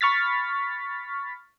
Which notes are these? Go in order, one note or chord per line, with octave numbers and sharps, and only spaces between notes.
B5 C#6 F6 A6 B6